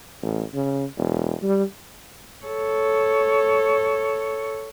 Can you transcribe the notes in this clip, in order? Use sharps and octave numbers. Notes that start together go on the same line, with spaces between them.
A1
C#3
E1
G3
A4 C#5